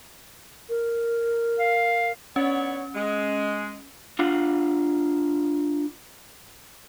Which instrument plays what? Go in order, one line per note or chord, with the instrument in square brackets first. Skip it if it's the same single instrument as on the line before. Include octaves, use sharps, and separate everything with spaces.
[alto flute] A#4
[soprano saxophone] F5
[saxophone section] B3 D4 C#5 [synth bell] C#4
[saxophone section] G#3
[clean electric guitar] D4 F4 F5 F#5